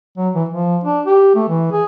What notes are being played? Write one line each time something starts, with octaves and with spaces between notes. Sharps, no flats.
F#3
E3
F3
D4
G4
A3
E3
G#4